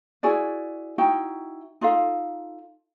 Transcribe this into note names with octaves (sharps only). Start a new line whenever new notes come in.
E4 F#4 G#4 D5
D#4 E4 F#4 G5
D#4 F4 A4 F5